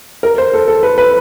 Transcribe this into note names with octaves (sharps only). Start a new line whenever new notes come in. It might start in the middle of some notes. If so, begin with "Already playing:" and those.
A#4
C5
A4
A4
B4
B4